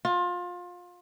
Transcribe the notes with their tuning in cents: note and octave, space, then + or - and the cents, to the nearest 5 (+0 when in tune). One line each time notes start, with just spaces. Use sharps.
F4 +25